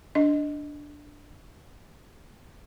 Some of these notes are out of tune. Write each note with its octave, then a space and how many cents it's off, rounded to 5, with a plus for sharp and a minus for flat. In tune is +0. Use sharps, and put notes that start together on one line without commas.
D4 +0 D#5 +0